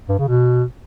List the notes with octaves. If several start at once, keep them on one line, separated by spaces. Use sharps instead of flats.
G2
C#3
B2